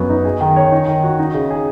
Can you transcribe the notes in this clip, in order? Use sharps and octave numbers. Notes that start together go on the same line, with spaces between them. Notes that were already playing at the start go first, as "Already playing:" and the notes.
Already playing: F#2 B3
D#4
G#4
D#3
C#5
D#4
D#3
F#4
D#4
C#3
G#4